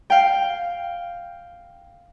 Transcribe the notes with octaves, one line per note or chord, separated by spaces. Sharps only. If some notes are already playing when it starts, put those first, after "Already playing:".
F5 G5